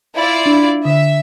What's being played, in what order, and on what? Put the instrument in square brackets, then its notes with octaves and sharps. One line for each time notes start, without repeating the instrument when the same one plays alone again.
[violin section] E4 F4 D5
[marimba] D4
[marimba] D3 [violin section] E5